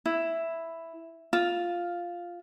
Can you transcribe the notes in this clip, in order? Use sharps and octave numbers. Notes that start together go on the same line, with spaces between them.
E4
F4